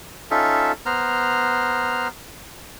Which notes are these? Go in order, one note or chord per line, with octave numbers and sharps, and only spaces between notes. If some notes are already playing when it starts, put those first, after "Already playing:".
C#4 D#4 F4 A4 E5
B3 C5 A#5 F6